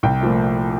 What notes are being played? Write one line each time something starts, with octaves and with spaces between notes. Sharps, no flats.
C2 G5
A#2 F3 A3